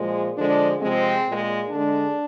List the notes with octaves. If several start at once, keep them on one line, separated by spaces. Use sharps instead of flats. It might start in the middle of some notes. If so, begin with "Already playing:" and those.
Already playing: A#2 F3 G#3
D3 F3 G#3 D4
C3 F3 G#3 C4
A#2 G#3
D3 G#3 D4